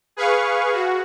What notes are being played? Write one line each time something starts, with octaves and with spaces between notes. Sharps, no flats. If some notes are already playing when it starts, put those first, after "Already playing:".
G#4 B4 F5 C#6
F#4